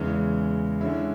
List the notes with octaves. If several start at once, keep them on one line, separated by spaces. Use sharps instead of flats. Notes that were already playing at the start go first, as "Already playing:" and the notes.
Already playing: E2 C#3 E3 G#3
D3 G#3 C#4 E4